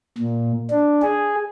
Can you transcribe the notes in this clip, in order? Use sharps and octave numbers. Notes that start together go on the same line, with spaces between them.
A#2
D4
G#4